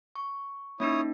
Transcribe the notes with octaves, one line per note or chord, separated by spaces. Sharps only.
C#6
A#3 C#4 D#4 E4 C#5 D#6